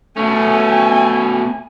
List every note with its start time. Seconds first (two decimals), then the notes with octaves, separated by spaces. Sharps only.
0.17 B2 A3 C#4 G#5